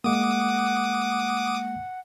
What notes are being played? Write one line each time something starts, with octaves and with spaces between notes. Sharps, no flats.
G#3 A#3 F#5 D6 D#6